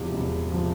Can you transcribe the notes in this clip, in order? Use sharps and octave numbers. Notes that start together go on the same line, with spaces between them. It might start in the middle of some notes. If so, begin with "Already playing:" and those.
Already playing: E1 E2 C3 F3 G4
E1
C3 F3